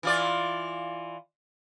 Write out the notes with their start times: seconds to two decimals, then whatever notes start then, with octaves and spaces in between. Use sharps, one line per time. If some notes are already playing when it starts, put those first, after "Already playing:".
0.03 E3 F4 D5